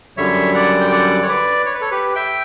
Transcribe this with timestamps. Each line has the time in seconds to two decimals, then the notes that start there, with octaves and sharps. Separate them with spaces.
0.17 F#2 D3 G3 C#5 E5
0.54 D5 F#5
0.80 G5
0.92 D5 F#5
1.22 C#5
1.29 B4 D5
1.66 C#5
1.74 B4
1.81 A4 C#5
1.91 G4 B4
2.15 E5 G5